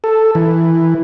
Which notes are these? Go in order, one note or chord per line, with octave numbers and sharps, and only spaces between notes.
A4
E3